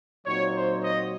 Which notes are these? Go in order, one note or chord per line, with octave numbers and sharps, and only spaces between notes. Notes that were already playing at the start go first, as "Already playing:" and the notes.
A#2 F#3 C4 D#4 C#5
C5
D#5